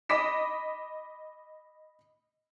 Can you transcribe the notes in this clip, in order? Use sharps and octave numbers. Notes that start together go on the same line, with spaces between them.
D#5 B5 D6 B6 E7